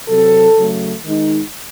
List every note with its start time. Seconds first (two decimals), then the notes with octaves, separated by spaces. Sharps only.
0.08 C3 F#3 C4 A4
0.56 C#3 F#3 A3
1.04 D#3 G#3 D#4